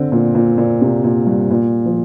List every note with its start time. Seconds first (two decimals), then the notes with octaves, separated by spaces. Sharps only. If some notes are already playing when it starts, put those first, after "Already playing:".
Already playing: D3 C4
0.12 A#2
0.35 A#2
0.58 A#2
0.81 C3
1.04 A#2
1.27 G2
1.50 A#2
1.85 F3